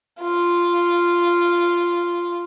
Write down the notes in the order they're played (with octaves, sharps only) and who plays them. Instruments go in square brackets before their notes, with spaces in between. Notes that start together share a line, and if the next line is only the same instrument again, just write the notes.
[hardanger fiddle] F4